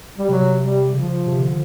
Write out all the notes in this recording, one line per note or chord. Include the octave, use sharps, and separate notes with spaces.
G3
C3 F#3
G3
C#3 F3
C3
D3